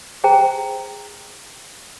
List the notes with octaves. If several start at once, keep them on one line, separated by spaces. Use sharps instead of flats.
G#4 C5 G5 A#5